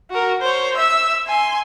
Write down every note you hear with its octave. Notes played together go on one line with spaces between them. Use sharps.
F#4 A#4
C5 C#5
E5 E6
G#5 C6